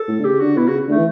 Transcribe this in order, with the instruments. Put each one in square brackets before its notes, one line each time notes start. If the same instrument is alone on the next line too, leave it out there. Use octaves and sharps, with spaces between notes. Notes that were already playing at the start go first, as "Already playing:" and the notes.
Already playing: [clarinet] A4
[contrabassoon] A2
D3
[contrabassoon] C#3 [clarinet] G4
[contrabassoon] D3 [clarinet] F#4
[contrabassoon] B2 [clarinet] E4
[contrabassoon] C#3 [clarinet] F#4
[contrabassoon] D3 [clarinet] A3
[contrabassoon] E3